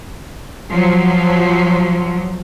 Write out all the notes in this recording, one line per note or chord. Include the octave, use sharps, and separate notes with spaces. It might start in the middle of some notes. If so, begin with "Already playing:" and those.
F3 F#3